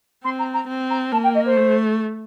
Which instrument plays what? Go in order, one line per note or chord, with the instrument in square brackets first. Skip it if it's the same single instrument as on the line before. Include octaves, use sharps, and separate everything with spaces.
[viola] C4 [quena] C6
[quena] A#5
A#5
[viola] C4
[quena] A#5
[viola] A#3 [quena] A5
[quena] G5
D#5
C5
[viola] A3